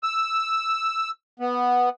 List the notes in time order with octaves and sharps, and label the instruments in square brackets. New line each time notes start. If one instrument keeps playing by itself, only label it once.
[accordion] E6
B3